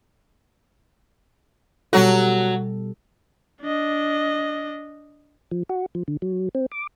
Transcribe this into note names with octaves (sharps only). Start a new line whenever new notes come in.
B2 F#3 G3 F#4 A4
D4 D#5
F3
F#4
F3
D3
F#3
C4
D6